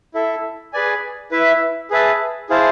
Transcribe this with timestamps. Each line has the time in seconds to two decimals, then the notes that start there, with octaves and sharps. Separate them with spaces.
0.14 E4 A4 E5
0.73 G#4 B4 D5 G#5
1.31 E4 B4 E5
1.90 G#4 B4 E5 A5
2.49 E4 G#4 C5 F5 A5